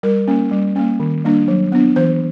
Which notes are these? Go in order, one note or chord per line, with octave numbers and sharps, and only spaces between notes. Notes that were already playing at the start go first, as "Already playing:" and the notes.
G3 A#4
A#3 C#4
G3
A#3 C#4
D#3
G3 A#3 D4
F#3
B3 D4
E3 C5